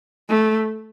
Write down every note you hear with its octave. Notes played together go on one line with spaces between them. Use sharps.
A3